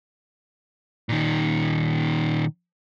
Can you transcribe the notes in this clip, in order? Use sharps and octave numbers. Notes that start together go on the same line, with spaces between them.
A#2 D#3